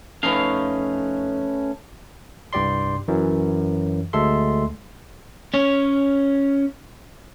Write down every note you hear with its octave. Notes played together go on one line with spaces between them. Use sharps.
F2 A3 C#4 D#4 B4 F5
C2 G2 G4 D5 C6
F#2 E3
D2 G#3 A4 E5 C6
C#4 C#5